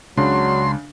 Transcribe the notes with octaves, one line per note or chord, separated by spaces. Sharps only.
C#2 C#3 F#3 D4 C6